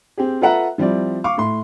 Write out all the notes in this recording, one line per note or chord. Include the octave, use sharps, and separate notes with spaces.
C4 G4 G#4
F4 A4 B4 E5 F#5 A#5
F3 G3 C4 E4 D5
F5 C#6 D6
A2 C6